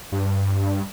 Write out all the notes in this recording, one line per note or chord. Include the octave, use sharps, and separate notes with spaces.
G2